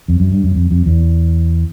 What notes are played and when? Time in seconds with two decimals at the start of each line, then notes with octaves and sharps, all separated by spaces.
0.08 F2
0.20 F#2
0.32 G2
0.44 F#2
0.55 F2
0.71 F2
0.86 E2